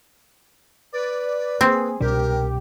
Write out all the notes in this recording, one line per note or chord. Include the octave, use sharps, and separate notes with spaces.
B4 D5
A#3 C4 G#4
C2 B2 D4 G4 A#4